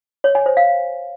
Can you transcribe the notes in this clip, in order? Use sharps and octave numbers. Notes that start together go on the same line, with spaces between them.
C#5
G#5
C5
F5